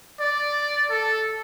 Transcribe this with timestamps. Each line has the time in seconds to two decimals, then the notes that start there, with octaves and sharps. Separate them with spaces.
0.20 D5
0.90 A4